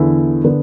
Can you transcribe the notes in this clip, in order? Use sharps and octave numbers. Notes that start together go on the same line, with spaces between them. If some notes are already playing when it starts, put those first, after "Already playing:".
Already playing: E2 D3 B3 E4
D3 B3 D4